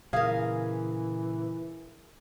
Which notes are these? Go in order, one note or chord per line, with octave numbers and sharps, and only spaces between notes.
A#2 C#3 E3 G#4 A#4 F5